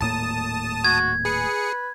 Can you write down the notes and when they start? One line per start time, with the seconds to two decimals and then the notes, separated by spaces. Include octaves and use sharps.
0.01 D#1 A2 A#3 A5 D#6
0.85 F#4 G#6
1.25 G#4 B4 C#7